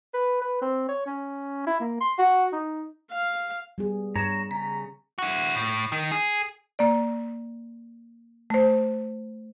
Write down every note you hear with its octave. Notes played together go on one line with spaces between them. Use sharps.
B4
B4
C4
C#5
C#4
E4
A#3
C6
F#4
D#4
F5
G3 B3 G#4
G2 C#5 A#5 E7
C#3 A#5 B6
E4 F#4
A2
D#3
G#4
A#3 D5
A3 C5